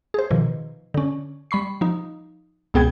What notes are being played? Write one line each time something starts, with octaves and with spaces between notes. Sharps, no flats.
G#4 C5
B2 D#3 F3
D3 C#4
G3 B5 C#6 C7
F3 D#4
C#2 B2 B3 G#4 G5 G#6